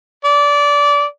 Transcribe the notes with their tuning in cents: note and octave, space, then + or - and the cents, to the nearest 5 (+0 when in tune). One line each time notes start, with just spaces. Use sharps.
D5 -20